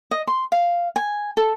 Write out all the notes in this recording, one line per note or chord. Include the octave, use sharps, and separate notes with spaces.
D#5
C6
F5
G#5
A4